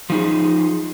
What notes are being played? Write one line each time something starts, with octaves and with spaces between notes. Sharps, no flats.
F3 D#4 G#4